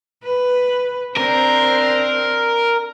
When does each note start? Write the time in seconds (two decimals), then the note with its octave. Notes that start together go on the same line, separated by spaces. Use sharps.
0.24 B4
1.17 C4 D4 A#4 C5